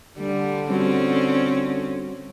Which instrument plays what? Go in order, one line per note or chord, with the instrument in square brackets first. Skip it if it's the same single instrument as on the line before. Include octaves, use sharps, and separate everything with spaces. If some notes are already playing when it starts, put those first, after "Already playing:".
[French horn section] D3 [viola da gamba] G3
[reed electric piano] G3 F#4 [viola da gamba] C4 C#4